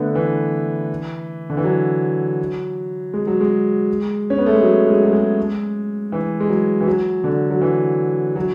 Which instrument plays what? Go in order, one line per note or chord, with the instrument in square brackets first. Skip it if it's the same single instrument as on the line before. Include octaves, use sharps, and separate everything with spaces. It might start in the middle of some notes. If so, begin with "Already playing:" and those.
Already playing: [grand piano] D3 A3 B3
E3
D3
E3
F#3
G#3
F#3
G#3
C#4
B3
A3
G#3
F#3
G#3
F#3
G#3
E3
G#3
F#3
E3
F#3
D3
F#3
E3
F#3